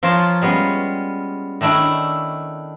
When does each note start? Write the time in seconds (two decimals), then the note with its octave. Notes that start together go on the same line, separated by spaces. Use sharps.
0.03 F3 F4 A#4 C#5 A5 C6
0.41 G3 G#3 B3 C#4
1.61 D#3 A3 D4 E4 C#5